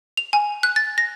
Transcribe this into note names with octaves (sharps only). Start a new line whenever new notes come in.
F7
G#5
F#6
A6
A#6